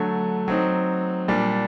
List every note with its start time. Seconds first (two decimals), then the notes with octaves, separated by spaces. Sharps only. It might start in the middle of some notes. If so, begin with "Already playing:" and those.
Already playing: D3 F#3 A3
0.48 F#3 C4 D#4
1.28 A#2 G3 D4